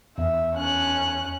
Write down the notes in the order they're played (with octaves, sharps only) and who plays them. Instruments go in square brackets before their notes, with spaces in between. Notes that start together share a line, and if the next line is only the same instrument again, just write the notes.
[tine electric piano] E2 [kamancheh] E5
[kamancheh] C#4 F#6